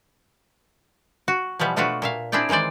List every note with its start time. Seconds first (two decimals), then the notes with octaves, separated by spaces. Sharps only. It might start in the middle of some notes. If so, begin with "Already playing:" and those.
1.28 F#4
1.59 B2 E3 F3 G3 B3
1.76 B2 A3 B3 D4 F4 F#4
2.02 A#2 E5 F5
2.32 C4 D4 E4 G#4 D5 G5
2.49 D#3 E3 G#3 C5 D5